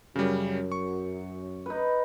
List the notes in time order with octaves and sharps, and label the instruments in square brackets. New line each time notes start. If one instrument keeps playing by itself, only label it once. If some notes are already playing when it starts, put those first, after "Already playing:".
[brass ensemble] F#2 [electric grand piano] C#3 G3
[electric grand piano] C#6
[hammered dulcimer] D#4 B4